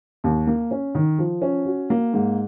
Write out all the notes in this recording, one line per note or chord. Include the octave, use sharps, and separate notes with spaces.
D#2
A#3
C#4
D#3
F3
C#4
F#4
A#3
G#2